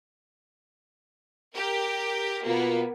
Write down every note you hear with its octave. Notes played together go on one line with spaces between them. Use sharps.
G4 A#4
B2 A#3 B3 F4